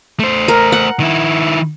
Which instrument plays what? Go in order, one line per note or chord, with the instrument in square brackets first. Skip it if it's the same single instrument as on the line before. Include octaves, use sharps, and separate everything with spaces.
[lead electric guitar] A3 C5
[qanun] A#4
F#5
[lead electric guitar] D#3 E4